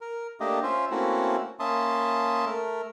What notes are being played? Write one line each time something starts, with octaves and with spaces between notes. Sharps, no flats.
A#4
A3 A#3 D4 G4 D#5
C#4 F4 C5 E5
A3 A#3 C4 C#4 E4 F#4
A#3 C#4 E5 A5 C6 D#6
A3 A#4